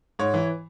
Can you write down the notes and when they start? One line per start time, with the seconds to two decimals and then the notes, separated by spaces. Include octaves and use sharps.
0.19 G#2 C#5
0.34 E3